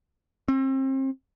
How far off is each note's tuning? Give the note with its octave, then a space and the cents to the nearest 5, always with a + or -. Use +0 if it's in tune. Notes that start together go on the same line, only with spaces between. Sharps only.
C4 +35